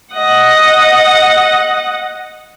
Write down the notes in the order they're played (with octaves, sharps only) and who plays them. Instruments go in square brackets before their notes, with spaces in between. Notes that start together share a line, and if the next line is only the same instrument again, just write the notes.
[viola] D#5 F#5